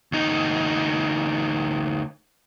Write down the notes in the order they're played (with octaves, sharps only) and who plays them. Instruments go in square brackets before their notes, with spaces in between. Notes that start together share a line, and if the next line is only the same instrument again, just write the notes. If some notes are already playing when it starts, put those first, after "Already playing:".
[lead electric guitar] D2 D#4